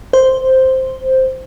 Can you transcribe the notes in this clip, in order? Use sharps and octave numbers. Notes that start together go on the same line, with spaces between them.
C5